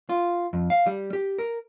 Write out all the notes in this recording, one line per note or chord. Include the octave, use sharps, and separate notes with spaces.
F4
F2
F5
G3
G4
A#4